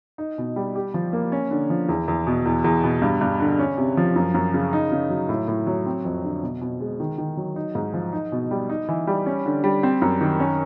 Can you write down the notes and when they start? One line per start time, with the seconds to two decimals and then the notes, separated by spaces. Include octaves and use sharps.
0.18 D#4
0.38 B2
0.56 G3
0.75 G4
0.94 F3
1.13 A#3
1.32 C#4
1.51 D3
1.70 F3
1.89 E2
2.08 E2
2.27 B2
2.46 E2
2.64 E2
2.84 B2
3.02 G2
3.21 G2
3.40 D3
3.59 C#4
3.78 C3
3.97 F3
4.16 F#2
4.34 F#2
4.54 C#3
4.73 D#4
4.92 C#3
5.10 F#3
5.29 A2
5.48 A2
5.67 F#3
5.86 C4
6.05 F2
6.24 D3
6.43 B2
6.61 B2
6.80 G#3
7.00 D#3
7.18 D#3
7.37 F#3
7.56 D#4
7.75 G#2
7.94 F3
8.13 D#4
8.32 B2
8.51 G3
8.69 D#4
8.89 E3
9.07 G3
9.26 C#4
9.46 D3
9.64 G3
9.83 C4
10.02 F#2
10.21 D#3
10.40 C#4